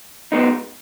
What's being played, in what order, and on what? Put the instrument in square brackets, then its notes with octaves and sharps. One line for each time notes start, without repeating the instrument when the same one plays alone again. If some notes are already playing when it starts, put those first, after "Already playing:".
[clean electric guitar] G#3 B3 D#4